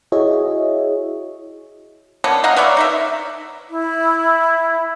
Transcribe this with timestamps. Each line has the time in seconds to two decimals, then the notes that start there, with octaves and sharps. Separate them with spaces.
0.12 E4 F#4 G#4 C#5 D#5 E5
2.24 A#3 B3 C#4 D4
2.44 D#5 F5 F#5 A#5
2.56 B4 C#5 D5 E5
2.77 D#4 A#4 E5
3.70 E4